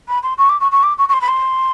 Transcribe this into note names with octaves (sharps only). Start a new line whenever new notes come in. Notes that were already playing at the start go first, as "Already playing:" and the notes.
B5
C6
C#6
D6
C#6
C#6
D6
C#6
C#6
C6
B5
C6